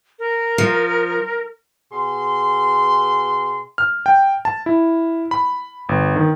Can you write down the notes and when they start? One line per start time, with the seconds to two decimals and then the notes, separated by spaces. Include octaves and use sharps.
0.19 A#4
0.58 F3
1.93 B2 G#4 C6
3.78 F6
4.06 G5
4.45 A5
4.66 E4
5.31 B5
5.89 G1
6.16 D#3